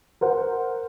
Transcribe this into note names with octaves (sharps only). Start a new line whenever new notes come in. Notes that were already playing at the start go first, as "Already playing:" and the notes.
A#4 C5 F#5